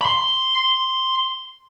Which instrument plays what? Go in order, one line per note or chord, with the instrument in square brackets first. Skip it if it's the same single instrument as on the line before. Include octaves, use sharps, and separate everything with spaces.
[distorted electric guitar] B5 C6